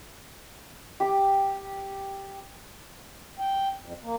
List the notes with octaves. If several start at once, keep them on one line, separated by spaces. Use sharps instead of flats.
G4 D6
G5
F2
A#3